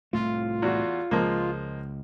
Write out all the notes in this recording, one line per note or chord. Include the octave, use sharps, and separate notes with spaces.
C2 A2 A3 F4
E2 F#4
C#2 F3 G#3 A#3